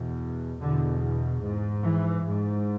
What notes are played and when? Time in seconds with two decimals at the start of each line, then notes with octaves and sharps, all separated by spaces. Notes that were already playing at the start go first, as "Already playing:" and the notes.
Already playing: E2 B2
0.61 E2 B2 D3
1.43 G#2
1.84 E3
2.25 G#2